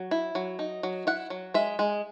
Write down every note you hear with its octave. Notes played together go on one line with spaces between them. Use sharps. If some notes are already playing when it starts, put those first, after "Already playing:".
Already playing: F#3
E4
F#3
D#4
F#3
E4 F#5
F#3
G#3 E5
G#3